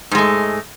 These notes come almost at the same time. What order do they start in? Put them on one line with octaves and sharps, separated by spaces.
G#2 G#3 A3